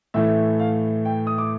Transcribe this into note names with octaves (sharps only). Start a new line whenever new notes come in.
A2 E3 A3 E5
F5
G5
D#6
D6